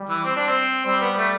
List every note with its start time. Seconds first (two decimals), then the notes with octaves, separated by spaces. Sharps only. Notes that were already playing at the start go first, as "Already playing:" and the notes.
Already playing: G3
0.09 E3
0.24 C4
0.36 D4
0.47 C4
0.85 G3 C4
1.01 B3
1.17 A3